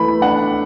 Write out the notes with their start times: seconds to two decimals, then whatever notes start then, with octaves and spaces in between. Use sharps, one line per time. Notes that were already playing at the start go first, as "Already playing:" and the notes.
Already playing: E3 A3 B5
0.21 D4 F#5